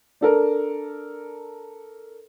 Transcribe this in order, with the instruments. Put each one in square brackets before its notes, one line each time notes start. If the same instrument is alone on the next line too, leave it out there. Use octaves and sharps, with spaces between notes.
[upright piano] D4 A4 A#4